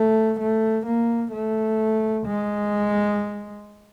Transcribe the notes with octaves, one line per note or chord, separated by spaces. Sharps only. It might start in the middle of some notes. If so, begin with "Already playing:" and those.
Already playing: A3
A3
A#3
A3
G#3